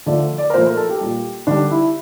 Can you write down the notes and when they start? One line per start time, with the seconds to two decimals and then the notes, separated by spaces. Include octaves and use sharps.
0.06 D3 F3 A3 D5
0.38 D5
0.50 A#4
0.53 A#2 F3 A3 C5
0.65 A#4
0.77 A4
0.89 G4
1.01 A#2 G3
1.47 D3 G3 D4
1.71 E4